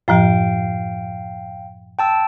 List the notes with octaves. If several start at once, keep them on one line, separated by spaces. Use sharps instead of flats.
F#2 A2 F3 F5 G5
G5 A5 E6